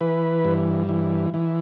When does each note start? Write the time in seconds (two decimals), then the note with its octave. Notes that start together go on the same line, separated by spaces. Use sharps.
0.01 E3 B4
0.45 G2
0.89 E3
1.34 E3